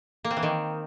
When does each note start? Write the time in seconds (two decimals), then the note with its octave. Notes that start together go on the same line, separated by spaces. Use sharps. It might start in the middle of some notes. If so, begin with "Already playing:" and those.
0.24 A#3
0.31 C4
0.37 E3
0.43 D#3